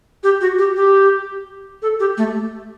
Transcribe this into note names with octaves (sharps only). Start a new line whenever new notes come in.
G4
F#4
G4
G4
A4
G4
A3